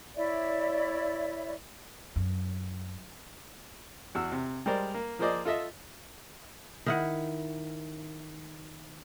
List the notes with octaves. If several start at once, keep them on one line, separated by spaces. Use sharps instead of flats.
E4 C#5 D5 E5
F#2
E2 F#4 E6
C3
G3 G#3 A#4 C5 D5
A#3
F3 A#3 G#4 C5 D5 D#5
F4 A4 D#5 E5
D#3 E4 F#5